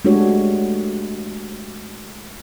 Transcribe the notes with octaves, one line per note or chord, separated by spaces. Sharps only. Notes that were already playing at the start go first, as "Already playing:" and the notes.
G#3 A3 D4 F#4 G4 C#5